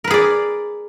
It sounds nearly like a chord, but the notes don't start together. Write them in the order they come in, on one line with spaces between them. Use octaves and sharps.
A#4 B4 G#4 D5